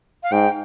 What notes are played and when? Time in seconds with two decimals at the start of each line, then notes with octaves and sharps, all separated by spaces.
0.23 F5
0.32 G#2 G5